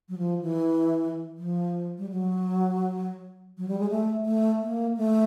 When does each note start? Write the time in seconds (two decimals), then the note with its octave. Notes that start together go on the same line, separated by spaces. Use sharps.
0.09 F#3
0.18 F3
0.42 E3
1.37 F3
1.98 G3
2.10 F#3
3.58 F#3
3.68 G3
3.79 G#3
3.90 A3
4.26 A3
4.62 A#3
4.97 A3